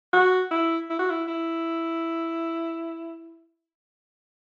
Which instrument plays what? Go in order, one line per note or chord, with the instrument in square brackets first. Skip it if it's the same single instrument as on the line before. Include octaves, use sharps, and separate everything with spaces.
[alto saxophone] F#4
E4
E4
F#4
E4
E4